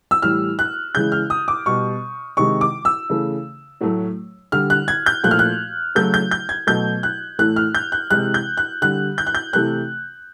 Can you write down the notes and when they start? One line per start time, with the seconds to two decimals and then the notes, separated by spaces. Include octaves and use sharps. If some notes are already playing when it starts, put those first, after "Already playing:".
0.11 E6
0.22 A2 E3 G3 F6
0.59 F#6
0.95 C#3 E3 G#3 G6
1.12 F6
1.30 D#6
1.48 D6
1.66 B2 G3 C#6
2.37 C3 D#3 G#3 C#6
2.61 D6
2.85 E6
3.10 C#3 E3 A3
3.81 A2 F#3 A3
4.52 D3 G3 F6
4.70 F#6
4.88 G#6
5.06 G6
5.23 A#2 F3 A3 F#6
5.31 F6
5.39 F#6
5.95 C#3 F#3 A3 G6
6.14 G6
6.31 G6
6.49 G#6
6.67 B2 F#3 A3 G6
7.03 F#6
7.39 A2 E3 A3 F#6
7.56 F6
7.75 G6
7.92 F#6
8.10 C3 E3 G#3 F#6
8.34 G6
8.57 F#6
8.82 D3 G3 F#6
9.18 G6
9.27 F#6
9.35 G6
9.53 C3 E3 A3 F#6